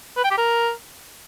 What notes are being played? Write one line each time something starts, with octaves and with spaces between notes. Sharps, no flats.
B4
G5
G4
A#4